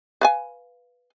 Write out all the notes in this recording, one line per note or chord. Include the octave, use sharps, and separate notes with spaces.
B4 F5 G#5